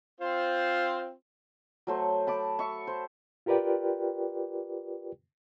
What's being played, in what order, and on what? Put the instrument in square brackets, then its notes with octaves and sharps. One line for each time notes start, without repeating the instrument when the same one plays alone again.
[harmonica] C4 F4 C5
[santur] F#3 A3 C5
A5 B5 D6
E5 C#6
C5
[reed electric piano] F4 G4 A#4 B4 D5 G5